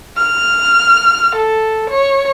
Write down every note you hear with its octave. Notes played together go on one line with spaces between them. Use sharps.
F6
A4
C#5